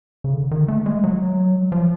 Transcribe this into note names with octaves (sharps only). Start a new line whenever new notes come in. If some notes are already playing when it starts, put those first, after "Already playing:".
C#3
D3
D#3
A3
G#3
F#3
F3